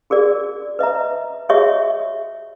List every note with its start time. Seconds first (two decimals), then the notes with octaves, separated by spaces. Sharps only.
0.10 F#4 G#4 A#4 D5
0.79 B4 D#5 E5 A#5
1.49 F#4 G#4 C#5 D#5 E5 C#6